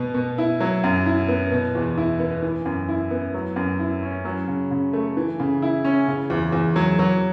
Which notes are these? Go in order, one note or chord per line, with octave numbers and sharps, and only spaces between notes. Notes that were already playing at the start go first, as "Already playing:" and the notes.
Already playing: B2 B3
B2
E4
F#3
F#2
E4
B3
B2
E2
E4
B3
E3
F#2
E4
B3
F#3
F#2
E4
C#4
F#3
C#3
C#3
A3
E3
C#3
E4
C#4
C#3
E2
E2
F#3
F#3